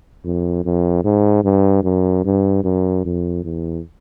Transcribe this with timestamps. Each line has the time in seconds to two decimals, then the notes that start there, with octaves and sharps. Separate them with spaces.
0.24 F2
0.65 F2
1.04 G#2
1.44 G2
1.84 F#2
2.24 G2
2.64 F#2
3.05 F2
3.44 E2